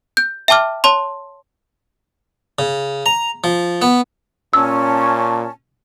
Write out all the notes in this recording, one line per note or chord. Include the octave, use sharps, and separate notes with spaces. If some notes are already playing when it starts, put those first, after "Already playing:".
G6
E5 G5 A5 D6 F6
C#5 A5 C6
C#3
A#5
F3
B3
A#2 C#4 A5 E6